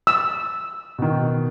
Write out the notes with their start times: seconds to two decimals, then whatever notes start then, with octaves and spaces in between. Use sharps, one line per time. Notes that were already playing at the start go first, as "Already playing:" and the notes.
0.07 E6
0.98 B2 D#3